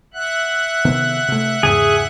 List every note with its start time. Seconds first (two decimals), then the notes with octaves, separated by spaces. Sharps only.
0.14 E5 F#5 F#6
0.85 C3 D#3 B3
1.28 C3 A3
1.63 E2 G#2 C#3 G#4